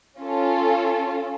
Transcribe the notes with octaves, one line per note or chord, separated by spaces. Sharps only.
C#4 F4 A4